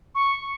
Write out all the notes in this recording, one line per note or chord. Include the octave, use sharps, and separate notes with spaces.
C#6